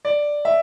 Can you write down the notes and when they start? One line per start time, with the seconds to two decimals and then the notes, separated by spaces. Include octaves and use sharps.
0.05 D5
0.45 E5